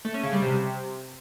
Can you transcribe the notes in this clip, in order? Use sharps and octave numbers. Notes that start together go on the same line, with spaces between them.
A3
C#4
C#3
G3
C3